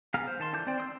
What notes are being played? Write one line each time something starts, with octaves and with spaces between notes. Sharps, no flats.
B3 G#4 F5 A#5 F6
C5
D#3 A5 C6
D3 E3 A5 D6 G6
C4 C5 D5 G5
C6 D#6 E6